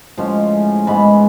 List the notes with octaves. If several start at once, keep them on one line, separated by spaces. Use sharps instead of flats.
A2 F3 G#3 C#4
G#2 E3 G#3 B3 B5